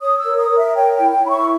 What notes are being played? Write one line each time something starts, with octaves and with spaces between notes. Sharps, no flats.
C#5 D#6
E6
A#4
D#6
A#4
E5
C#5 G5
G5
E4
G5
E4 B5
C#6